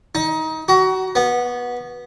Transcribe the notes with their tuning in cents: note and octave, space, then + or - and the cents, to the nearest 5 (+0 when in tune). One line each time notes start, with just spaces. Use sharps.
D#4 +25
F#4 +25
B3 -15